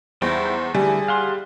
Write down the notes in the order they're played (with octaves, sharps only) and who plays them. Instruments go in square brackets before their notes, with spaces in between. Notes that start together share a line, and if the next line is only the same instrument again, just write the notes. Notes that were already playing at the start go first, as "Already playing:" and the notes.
[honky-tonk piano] E2 [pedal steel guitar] G3 D#4 E4 [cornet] C5
[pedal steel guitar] D3 E3 A3 [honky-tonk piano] G3 [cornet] G#4 [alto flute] G#5
[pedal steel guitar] F5 F#5 C6